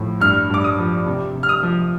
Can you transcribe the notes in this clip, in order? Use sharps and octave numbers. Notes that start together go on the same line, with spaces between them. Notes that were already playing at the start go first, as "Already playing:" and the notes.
Already playing: A2 F3
G2 F6
G2 D6
D#6
F3
C3
C3
F6
D#6
F3